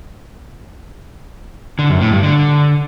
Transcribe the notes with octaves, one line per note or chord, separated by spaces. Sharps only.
D3
F#2
A2
G2
D3